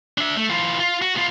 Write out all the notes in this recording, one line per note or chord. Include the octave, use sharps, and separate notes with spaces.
D4 E5
A3
E3 F4
F4
F#4
B3 F4